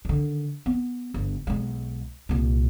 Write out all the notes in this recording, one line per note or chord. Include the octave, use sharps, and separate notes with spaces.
D3 D#3
B3
G1
B1 G#3
C2 A#2